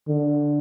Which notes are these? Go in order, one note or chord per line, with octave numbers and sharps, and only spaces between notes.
D3